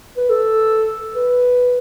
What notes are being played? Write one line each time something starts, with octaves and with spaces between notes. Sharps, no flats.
B4
A4
B4